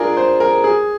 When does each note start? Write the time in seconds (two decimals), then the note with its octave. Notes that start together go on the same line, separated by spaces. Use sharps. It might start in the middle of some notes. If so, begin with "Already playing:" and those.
Already playing: D4 F4 G#4 A#4
0.17 C5
0.40 A#4
0.64 G#4